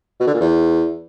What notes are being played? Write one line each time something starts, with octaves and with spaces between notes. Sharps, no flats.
B2
D3
A#2
E2